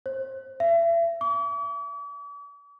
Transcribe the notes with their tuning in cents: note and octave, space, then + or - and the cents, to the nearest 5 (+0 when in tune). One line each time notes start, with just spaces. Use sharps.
C5 +25
E5 +35
D6 -45